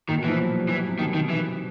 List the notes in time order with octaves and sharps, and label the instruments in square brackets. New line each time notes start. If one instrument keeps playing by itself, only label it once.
[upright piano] A#2 [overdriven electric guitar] D#3
[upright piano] B2
[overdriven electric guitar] E3 [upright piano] F3
[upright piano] F#3
G3
[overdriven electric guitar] E3 [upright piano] G3
[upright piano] F#3
C3
[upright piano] B2 [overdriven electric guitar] D#3
[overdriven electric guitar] D#3
E3